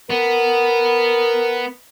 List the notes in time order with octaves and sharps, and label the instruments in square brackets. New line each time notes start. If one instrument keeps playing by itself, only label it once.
[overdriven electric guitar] B3 [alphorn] A#4